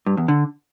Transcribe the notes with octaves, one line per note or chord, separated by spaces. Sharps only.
G2
E2
D3